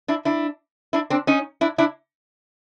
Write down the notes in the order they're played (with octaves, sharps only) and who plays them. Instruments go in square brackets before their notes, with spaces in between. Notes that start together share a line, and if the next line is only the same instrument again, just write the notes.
[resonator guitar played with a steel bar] D4 E4
D4 E4
D4 E4
C4 D4
C#4 D#4
D4 E4
D4 E4